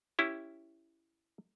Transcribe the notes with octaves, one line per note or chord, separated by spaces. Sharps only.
C#4 E4 G4